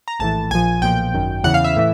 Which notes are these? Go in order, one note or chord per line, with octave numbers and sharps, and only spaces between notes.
A#5
A#1 A2 E3 A5
A#1 A#2 F3 G#5
B1 A#2 F3 G5
G#1 F#2 D#3
E2 C#3 E3 F#5
F5
E5
A2 E3